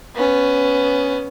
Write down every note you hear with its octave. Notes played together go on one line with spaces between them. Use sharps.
B3 C#4